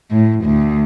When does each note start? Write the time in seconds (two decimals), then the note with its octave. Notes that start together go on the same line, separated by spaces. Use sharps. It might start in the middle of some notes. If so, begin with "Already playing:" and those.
0.11 A2
0.44 D2